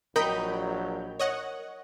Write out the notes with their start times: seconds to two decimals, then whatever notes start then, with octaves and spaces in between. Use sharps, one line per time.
0.16 A#1 F#3 D#4 A#4 G5 B5 G6
1.19 C#5 D#5 F#5